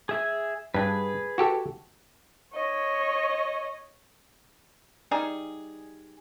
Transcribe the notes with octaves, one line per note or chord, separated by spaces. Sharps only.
G#4 E5 G#5
G2 D4 G#4 B4
F#4 G4 A4
C#5 D#5
G3 D#4 G#4